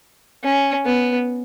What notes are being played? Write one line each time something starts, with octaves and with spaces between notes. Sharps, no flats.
C#4
B3